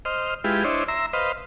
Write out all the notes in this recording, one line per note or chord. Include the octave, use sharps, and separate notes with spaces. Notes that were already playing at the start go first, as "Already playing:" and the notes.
C5 D#5 F6
G#3 E4 F4 G4 B4
D4 E4 C5 C#5 D#5
E5 A#5 C6 E6
B4 C5 D#5 F5